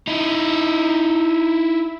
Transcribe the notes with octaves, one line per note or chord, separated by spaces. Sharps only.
D#4 E4